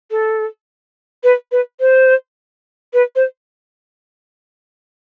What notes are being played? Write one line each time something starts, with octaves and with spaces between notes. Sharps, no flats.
A4
B4
B4
C5
B4
C5